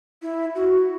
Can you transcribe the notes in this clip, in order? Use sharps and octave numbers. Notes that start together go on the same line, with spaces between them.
E4
F#4